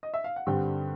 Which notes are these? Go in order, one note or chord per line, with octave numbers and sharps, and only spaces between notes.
D#5
E5
F5
F#5
G2 D3 G3 C4 G4 G5